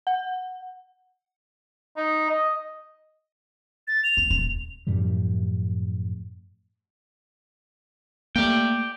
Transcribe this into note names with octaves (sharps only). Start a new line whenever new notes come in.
F#5
D#4
D#5
A6
F7
B3
D#1
F#2 A2 F3 G3
A3 A#3 D5 G5